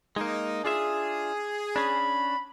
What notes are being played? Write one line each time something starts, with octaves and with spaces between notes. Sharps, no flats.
G#3 A#3 D#4
D4 F4 G#4 E5
C#4 D4 B5